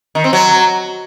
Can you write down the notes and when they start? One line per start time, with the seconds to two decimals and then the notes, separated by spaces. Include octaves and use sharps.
0.15 D#3
0.24 C4
0.33 F#3